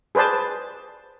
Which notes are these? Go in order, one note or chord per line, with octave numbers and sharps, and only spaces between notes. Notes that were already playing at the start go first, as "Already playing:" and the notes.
G#4 B4 C5 D5 A5